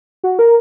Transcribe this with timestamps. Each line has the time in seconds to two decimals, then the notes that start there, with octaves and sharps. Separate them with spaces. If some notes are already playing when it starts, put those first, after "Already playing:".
0.24 F#4
0.39 A#4